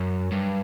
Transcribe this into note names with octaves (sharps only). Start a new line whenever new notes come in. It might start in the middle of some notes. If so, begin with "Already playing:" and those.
Already playing: F#2
G2